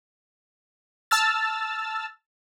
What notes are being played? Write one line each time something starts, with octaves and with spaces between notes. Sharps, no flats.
A5 E6 F6 A6